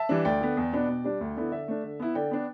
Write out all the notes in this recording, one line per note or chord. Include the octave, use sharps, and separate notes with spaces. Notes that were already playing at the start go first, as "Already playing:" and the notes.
Already playing: E5 A5
E3 G3 D4
D2 D5 G5
D3 B3
E2
B2 B3 D4
B2
G3 D4
D2
D3 B3 E4
D3 E5
A3 D4
D3
B3 E4
D3 D5 G5
B3 D4